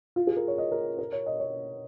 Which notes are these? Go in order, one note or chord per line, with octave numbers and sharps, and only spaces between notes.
F4
G#4
A#4
C#5
D#5
A#4
A#4
C#5
D#5
C#5